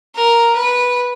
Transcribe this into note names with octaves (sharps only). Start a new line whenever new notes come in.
A#4
B4